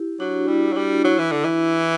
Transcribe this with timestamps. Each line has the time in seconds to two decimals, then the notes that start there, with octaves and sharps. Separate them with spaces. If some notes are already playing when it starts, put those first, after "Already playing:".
Already playing: E4 G4
0.20 F#3 D4 F#4
0.48 G3 E4
0.68 E4
0.73 F#3
0.76 G3 D4 F#4
1.04 F#3 E4
1.19 E3
1.31 D3
1.44 E3